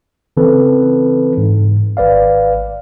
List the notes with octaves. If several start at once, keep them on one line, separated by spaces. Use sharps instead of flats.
C#3 E3 C4 A4 B4
G#2
G#1 B4 D5 F5